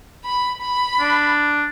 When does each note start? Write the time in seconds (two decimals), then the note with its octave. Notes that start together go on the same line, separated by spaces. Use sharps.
0.24 B5
0.61 B5
1.00 D4